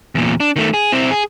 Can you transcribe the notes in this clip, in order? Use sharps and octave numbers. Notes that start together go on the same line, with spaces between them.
E2 A#2
D4
D#3 A3
G#4
C4 E4
G#4